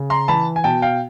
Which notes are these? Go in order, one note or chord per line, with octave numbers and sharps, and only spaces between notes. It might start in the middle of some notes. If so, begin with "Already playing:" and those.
Already playing: C#3
A#5 C6
E3 A5 B5
G#5
B2 G5 A5
F5 G5